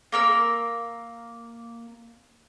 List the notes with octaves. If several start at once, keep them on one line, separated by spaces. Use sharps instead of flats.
A#3 A#4 E6